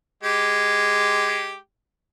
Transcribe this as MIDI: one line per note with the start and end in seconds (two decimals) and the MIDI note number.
0.24 1.55 56
0.24 1.55 67